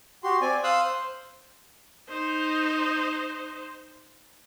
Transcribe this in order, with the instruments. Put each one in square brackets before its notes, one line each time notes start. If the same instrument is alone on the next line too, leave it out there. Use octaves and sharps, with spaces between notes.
[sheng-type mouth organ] F#4 G4 C6
C4 D5 G#5
F5 C6 D#6 E6 F#6
C5
[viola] D#4 C5